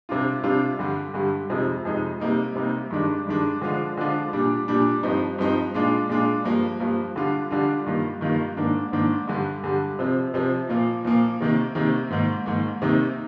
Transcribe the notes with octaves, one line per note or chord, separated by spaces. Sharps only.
C3 G3 D4 F4
C3 G3 D4 F4
G2 D3 G3
G2 D3 G3
F2 C3 F3 G#3 D#4
F2 C3 F3 G#3 D#4
C3 G3 A#3 D#4
C3 G3 A#3 D#4
G2 D#3 G#3 D4
G2 D#3 G#3 D4
D3 F3 G#3 D4 F4
D3 F3 G#3 D4 F4
A#2 G3 D4
A#2 G3 D4
G2 F3 C4 D#4
G2 F3 C4 D#4
A#2 G#3 D4 F4
A#2 G#3 D4 F4
G2 F3 A#3
G2 F3 A#3
D3 G3 D4 F4
D3 G3 D4 F4
G2 D#3 A#3 F4
G2 D#3 A#3 F4
G#2 D#3 A#3 D4
G#2 D#3 A#3 D4
G2 D3 G3
G2 D3 G3
C3 F3 C4
C3 F3 C4
A#2 F3 A#3 F4
A#2 F3 A#3 F4
C3 D#3 A#3
C3 D#3 A#3
G#2 D#3 A#3
G#2 D#3 A#3
C3 D#3 A#3 D#4